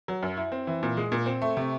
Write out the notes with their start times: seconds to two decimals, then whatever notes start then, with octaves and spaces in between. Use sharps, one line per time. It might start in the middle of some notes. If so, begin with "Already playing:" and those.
0.08 F#3
0.23 F#2
0.37 E4
0.52 C4
0.67 E3
0.83 A#2
0.97 G#3
1.12 A#2
1.26 C4
1.42 A3
1.57 C3